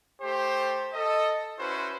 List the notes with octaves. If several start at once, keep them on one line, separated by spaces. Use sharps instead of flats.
A3 G4 C5
A4 D#5
C#4 E4 F#4 B4 C5